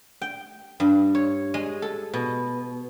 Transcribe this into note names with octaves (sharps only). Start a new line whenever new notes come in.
G5
G2
C#5
G#3
A4
B2